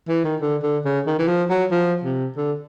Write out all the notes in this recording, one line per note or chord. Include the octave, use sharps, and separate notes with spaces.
E3
D#3
D3
D3
C#3
D#3
E3
F3
F#3
F3
C3
D3